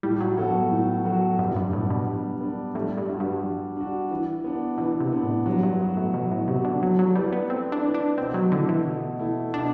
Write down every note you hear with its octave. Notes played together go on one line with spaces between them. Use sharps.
A2 G3
F#3
G2 F#3 B3 F#4 A4
A2
F#3 B3 F#4 A4
G2 G3
F#2
G2
A2 B3 D4
B2
G3
B3 D4
A2 G3
G2
D4 F#4
G2
G3
D4 F#4
E3
B3 D4
B2 E3
C3
B3 D4
A2
G2 F#3
G2
B3 F#4
A2
B2 F#3
A2
C3 B3 F#4
D3
F#3 A3
F#3
G3 E4 B4 D5
B3
A3 C4
D4
E4 B4 D5
D4
B2 C4
F#3
D3 A3 E4
E3
B2
A3 E4
B2 D4